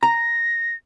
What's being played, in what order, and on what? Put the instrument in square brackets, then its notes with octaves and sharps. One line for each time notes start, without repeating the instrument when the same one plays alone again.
[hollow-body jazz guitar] A#5 [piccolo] A#6